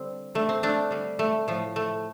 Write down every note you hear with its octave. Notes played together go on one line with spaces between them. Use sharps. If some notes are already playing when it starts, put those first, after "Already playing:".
Already playing: D3 G3 C4
D3 G3 A3
C4
A3 D4
D3 G3
A3
A2 F3 A3
A3